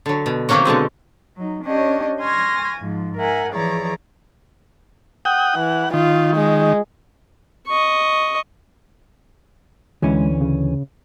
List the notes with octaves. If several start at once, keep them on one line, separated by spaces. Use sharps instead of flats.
D3 F#3
B2
C3 D#3 F#3 A#3 C#4 F#4
B2 D3 G#3 C4
F#3 D#4
C#4 D4 G4 C#5 D#5
G#5 C6 C#6 F6 G#6 A#6
G#2 F3
A#4 E5 F#5 G#5
E3 F3 G#4 C#5 D5 A#5
F#5 G5 D#6
E3 F#5
D#3 F4
G#3
D#5 C#6
D2 E3 G#3 C#4
C#3